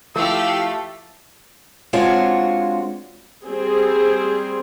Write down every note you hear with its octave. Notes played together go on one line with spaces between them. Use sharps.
F3 A3 E4 G4 F5 E6
G#3 C4 D4 F4 F#4 C#5
G3 C4 G#4